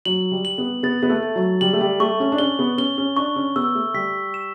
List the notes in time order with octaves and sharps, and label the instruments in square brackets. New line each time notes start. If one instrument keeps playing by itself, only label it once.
[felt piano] F#3 [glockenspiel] F#7
[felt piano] G3
[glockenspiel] F#7
[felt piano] B3
[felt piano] B3 [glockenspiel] A6
[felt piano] B3
A3
[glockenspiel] A6
[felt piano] F#3
[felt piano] G3 [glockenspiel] F#7
[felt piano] A3
G3
[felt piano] A3 [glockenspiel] C#6
[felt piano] C#4
D4
[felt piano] C#4 [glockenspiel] G7
[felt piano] B3
[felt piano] C#4 [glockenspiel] G7
[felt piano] C#4
[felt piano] D4 [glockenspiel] C#6
[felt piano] C#4
[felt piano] B3 [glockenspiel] E6
[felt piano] A3
[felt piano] G3 [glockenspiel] B6
[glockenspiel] E7